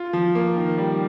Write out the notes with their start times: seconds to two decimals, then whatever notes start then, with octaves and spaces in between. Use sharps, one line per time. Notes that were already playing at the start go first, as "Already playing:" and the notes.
Already playing: F4
0.13 F3
0.35 A#3
0.56 D#3
0.78 G3